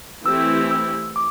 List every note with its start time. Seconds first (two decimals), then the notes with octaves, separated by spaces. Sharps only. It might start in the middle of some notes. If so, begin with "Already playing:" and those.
0.25 E3 A3 C4 E4 G4 E6
0.71 E6
1.16 D6